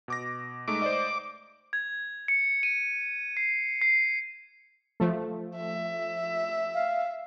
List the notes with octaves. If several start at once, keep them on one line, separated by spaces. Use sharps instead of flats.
B2 D6 A#6
G#3 A3 D#4 D6
C5 D5 D#5
G#6
C#7
D#7
C7
C7
F3 A3
E5
F5